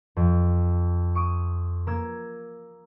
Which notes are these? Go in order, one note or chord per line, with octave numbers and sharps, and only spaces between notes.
F2
C#6 D#6 D7
A#3 E6 G#6